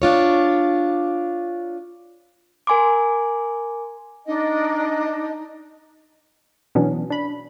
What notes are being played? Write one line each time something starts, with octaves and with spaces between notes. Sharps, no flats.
D4 F4 C#5
A#4 G#5 C6 D6
D4 D#4 D#5
B2 E3 F#3 B3 C#4 D4
D4 B5